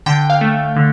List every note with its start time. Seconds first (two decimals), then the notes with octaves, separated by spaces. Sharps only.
0.06 D3 G5
0.30 F5
0.41 A3
0.76 D3